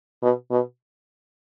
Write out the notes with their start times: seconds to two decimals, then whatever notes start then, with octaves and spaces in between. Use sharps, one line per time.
0.22 B2
0.51 B2